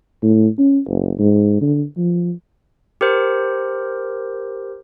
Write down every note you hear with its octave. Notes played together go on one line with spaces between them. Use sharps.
A2
C#4
F#1
G#2
D3
F3
G4 A#4 C5